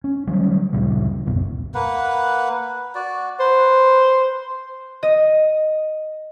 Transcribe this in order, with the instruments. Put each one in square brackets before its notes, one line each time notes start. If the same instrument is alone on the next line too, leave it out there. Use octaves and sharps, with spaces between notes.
[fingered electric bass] C#4
D#3 F#3 G3
D2 A#2 C#3 G3
D#1 B1 F#2 B2
[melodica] A#3 B4 F#5
F#4 D5
[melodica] B4 [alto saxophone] C5
[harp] D#5